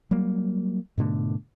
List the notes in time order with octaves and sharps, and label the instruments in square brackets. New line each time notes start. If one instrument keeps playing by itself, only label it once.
[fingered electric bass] F#3 G3 A#3
G#2 B2 D3 A3